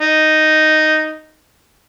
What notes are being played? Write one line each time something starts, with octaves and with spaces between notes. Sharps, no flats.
D#4